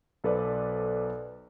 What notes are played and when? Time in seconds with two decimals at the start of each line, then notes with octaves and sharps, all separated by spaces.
0.24 B1 A4 B4 C5 D5